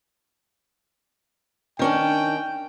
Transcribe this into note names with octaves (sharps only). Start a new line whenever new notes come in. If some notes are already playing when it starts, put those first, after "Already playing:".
D#3 C#4 D4 G5